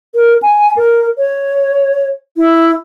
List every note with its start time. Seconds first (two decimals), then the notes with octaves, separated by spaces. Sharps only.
0.14 A#4
0.43 G#5
0.77 A#4
1.18 C#5
2.37 E4